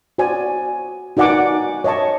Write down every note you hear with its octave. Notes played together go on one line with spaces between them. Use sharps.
F#4 C5 D5 G#5
D#4 F#4 D5 F#5 G#5 D6
C#5 D#5 E5 A5 C#6